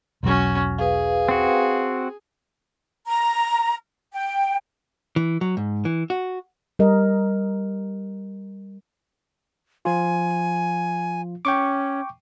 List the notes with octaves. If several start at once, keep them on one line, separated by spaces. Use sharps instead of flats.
E1 B1 F#3 C#4 F#4
G#4 B4 F5
C4 F#4
A#5
G5
E3
F#3
G#2
E3
F#4
G3 A#4 D#5
F3 F4 G#5
C#4 G5 C#6 D6